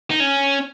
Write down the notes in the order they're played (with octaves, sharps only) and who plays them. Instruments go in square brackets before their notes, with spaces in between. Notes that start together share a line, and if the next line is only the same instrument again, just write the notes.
[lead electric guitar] D#4
C#4